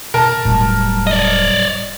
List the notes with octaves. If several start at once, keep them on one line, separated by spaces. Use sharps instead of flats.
B2 A#4 A5
E1 A2 F#3 G3
D5 D#5